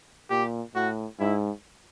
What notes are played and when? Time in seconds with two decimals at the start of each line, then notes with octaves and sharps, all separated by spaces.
0.30 A#2 G4
0.75 A2 F#4
1.20 G#2 E4